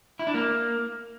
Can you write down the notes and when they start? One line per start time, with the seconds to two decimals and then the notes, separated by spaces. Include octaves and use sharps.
0.19 E4
0.27 D4
0.34 A#3